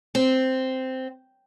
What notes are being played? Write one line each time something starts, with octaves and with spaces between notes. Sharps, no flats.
C4